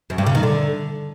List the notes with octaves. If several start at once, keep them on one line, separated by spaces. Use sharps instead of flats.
F#2
G2
C#3
D#3
D3